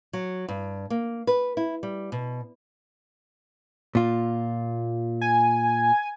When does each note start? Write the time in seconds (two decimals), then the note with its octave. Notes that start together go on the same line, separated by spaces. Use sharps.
0.13 F#3
0.48 G2
0.90 A#3
1.27 B4
1.57 E4
1.83 G3
2.12 B2
3.95 A#2 F4
5.21 G#5